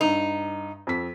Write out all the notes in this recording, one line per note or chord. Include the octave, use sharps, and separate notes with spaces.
G2 D#4
F2 B6